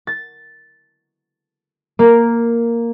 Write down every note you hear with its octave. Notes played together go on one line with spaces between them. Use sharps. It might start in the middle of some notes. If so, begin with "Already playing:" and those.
A6
A#3